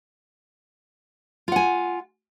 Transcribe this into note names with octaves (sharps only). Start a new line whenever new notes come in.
F4 F#5 G#5